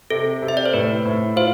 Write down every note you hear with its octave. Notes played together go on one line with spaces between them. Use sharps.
C3 A4
C3
E5
D5
C5
A2 B4
A2
F4 C5